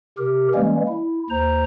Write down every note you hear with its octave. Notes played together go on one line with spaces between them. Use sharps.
C3 G4 A#4
E3 G3 G#3 A#3 C#4
E4
D#2 C5 A#5